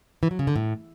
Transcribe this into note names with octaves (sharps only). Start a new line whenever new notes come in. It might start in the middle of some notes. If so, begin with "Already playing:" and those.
E3
F#3
C#3
D3
A2